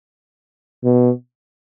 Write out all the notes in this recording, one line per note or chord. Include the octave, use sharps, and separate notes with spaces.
B2